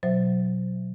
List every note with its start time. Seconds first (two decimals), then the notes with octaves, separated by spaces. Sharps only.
0.03 B2 F#3 C5 E5